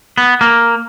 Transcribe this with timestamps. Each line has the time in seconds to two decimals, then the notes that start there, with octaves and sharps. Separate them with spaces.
0.18 B3
0.41 A#3